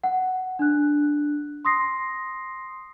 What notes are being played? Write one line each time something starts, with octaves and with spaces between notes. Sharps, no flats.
F#5
D4 F#6
C6 D#6 A#6 C7